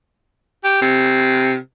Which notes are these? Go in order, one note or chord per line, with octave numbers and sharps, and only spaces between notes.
G4
C3